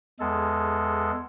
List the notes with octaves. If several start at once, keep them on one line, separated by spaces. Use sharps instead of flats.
E2 G#3 A4